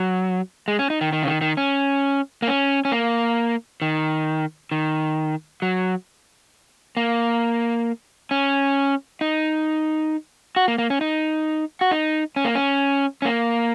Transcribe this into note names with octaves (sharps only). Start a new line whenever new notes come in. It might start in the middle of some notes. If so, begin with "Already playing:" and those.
Already playing: F#3
G#3
C#4
D#4
D#3
D#3
C#3
D#3
D#3
C#4
A#3
C#4
C#4
A#3
D#3
D#3
F#3
A#3
C#4
D#4
F#4
A#3
A#3
C#4
D#4
F#4
D#4
C#4
A#3
C#4
C#4
A#3